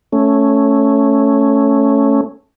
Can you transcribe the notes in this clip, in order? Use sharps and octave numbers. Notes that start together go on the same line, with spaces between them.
A3 C#4